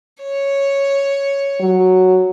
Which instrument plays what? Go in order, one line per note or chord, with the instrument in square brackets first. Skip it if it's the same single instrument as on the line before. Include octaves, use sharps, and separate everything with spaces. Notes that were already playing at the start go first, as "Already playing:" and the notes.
[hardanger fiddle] C#5
[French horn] F#3